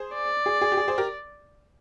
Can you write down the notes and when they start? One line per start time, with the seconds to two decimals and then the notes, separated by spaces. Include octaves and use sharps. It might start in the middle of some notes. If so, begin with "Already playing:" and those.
Already playing: G#4 C5
0.14 D5
0.46 G#4
0.61 G#4
0.72 G4
0.77 G#4
0.88 G#4 C5
0.98 G4 A#4